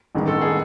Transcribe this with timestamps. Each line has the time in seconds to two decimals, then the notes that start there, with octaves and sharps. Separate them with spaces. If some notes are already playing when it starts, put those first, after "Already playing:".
0.15 A1 G2 D#3 G#3 B3
0.28 A4
0.42 G#4